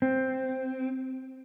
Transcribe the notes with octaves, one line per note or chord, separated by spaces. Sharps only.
C4